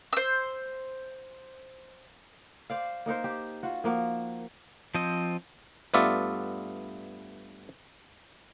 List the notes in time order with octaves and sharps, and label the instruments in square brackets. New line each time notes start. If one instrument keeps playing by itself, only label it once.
[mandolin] C5 E6
[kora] C5 D5 F5
A#3 D#4 A#4 C5
G4
F4 F#4
F3 A#3 F#4
[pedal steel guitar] F3 C4 D#5
[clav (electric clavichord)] G2 A3 B3 F4 D5 E5